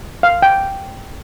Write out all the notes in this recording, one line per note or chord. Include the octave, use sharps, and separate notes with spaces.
F5
G5